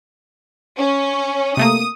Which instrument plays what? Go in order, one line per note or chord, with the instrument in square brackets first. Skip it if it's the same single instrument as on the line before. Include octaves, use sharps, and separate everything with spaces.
[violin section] C#4
[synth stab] C3 A3 A#3 [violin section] D#6